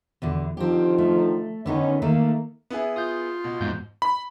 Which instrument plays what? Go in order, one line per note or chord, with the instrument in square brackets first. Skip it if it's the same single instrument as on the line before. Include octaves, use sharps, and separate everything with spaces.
[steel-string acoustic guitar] E2 B2 D3
[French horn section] D3 D#3 F3 [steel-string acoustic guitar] C4 G4
[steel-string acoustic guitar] A3
[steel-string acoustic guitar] D3 B3 D#4 [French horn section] D#3 C#4
[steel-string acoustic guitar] D#3 A3 D#4 [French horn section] A#3
[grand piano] B3 E4 G#4
[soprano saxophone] F4 [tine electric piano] D#6 G6
[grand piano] B2
[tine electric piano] E2 G6 [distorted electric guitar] G#2
[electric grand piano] B5